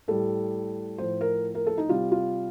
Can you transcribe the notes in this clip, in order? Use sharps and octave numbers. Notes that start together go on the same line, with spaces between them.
A2 G3 A4
A2 F3 C5
A#4
A#4
A4
D#4
C3 G3 F4
F4